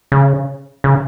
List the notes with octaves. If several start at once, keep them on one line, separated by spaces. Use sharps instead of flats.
C#3
C#3